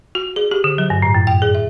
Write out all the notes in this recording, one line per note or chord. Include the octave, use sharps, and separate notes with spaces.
F#4
G#4
G4
D3
F#3
G2
A2
F#2
G5
G#4
E5